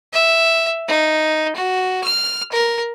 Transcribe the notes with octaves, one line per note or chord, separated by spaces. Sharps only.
E5
D#4
F#4
F6
A#4